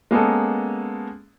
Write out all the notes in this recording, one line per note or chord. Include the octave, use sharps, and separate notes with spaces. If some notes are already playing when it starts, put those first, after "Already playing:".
G#3 A#3 B3 C#4 A4